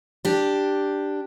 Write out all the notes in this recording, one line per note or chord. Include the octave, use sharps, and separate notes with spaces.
D4 G4